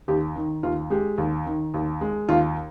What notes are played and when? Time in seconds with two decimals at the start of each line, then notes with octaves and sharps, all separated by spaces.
0.08 D#2 G4
0.36 D#3
0.63 D#2 F4
0.90 G#3 G4
1.18 D#2
1.46 D#3
1.74 D#2
2.01 G#3
2.29 D#2 F4